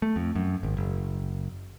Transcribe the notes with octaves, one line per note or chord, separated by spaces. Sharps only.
A3
F2
F#2
G#1
F#1